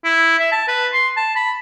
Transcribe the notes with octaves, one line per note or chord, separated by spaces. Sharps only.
E4
E5
A5
B4
C6
A5
B5